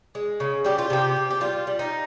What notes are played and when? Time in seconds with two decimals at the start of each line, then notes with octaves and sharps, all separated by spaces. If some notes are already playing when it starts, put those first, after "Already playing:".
0.15 G#3
0.40 C#3
0.65 G3 G4
0.78 F4
0.90 C3 G4
1.16 C3
1.30 G4
1.41 G3 F4
1.67 G3
1.79 D#4